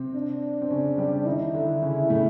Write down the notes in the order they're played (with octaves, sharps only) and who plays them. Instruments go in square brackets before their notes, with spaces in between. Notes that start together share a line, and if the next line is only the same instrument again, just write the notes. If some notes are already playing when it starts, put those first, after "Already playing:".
Already playing: [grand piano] C3 C4
[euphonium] D4
[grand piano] C4
C#3 C#4
G3 G4
[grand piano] D#3 D#4 [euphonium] E4
[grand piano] D3 D4
C#3 C#4
A2 A3